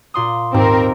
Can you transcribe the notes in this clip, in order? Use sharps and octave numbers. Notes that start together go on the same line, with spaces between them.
A#2 C6 D#6
D#2 G#2 C4 A#4